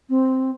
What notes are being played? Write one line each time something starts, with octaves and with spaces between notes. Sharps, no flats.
C4